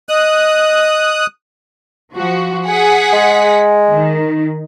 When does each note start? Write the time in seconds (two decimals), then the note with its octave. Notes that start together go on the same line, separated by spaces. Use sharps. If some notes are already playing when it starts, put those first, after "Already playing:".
0.09 D#5 D#6 F#6
2.14 F3 F#4
2.68 G#4 F#5 B6
3.13 G#3
3.90 D#3